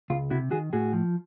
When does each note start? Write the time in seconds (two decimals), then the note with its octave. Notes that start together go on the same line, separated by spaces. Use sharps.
0.10 C#2 F4
0.30 C3 E4 F#4
0.51 D#3 F#4 G#4
0.73 A2 F#4 G#4
0.93 F3